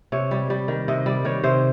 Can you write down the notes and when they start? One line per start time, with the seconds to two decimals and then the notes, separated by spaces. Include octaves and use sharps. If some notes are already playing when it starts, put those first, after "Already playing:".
0.12 C3 C#5
0.31 G3
0.50 G3
0.68 D#3
0.88 C3 D#5
1.06 G3 D5
1.25 D#3 C#5
1.44 C3 C5